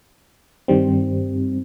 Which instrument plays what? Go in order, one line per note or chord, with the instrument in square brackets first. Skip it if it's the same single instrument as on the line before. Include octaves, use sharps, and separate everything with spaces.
[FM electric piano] G2 D#3 G3 C4